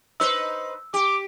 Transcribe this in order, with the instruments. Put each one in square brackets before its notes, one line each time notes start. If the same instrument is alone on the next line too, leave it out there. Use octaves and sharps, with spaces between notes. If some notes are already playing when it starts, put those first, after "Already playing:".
[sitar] D#4 B4 C5 [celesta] E6
[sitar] G4 [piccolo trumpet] D6